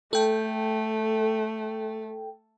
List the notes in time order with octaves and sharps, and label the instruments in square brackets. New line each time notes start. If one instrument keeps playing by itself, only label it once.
[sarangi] A3 [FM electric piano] A4 G5